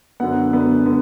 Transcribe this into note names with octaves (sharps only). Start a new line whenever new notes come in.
F#2 D3 B3 F#5
F#2 D3 B3
D3 B3